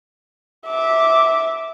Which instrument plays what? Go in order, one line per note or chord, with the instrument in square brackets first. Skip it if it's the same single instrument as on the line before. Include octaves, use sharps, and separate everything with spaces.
[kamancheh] E5 D6